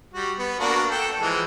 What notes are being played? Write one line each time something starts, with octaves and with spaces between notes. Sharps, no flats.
G3 F#4
B3
A#3 D4 F#4
A4 G5
E3 F3 G#3